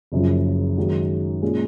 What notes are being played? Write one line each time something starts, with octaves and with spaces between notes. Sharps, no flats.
F#1 F#2 C#3 F3
F#2 D#3 G#3 D#4 F#4
A#2 G#3 C#4